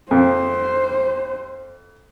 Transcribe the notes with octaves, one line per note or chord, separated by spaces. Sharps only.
F2 C5